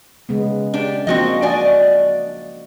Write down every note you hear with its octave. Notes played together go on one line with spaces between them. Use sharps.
C#3 G#3 B3
D4 G4
F3 A#3 C4 D4 F#4 D#5
D4 F#4 D5 D#5 G#5